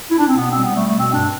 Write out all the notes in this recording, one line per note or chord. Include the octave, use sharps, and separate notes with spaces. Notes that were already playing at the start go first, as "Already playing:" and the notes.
E4
D4
C4
B2 B3
C4
G3
B3
G3 A3
A3
B2
C4
G2 D4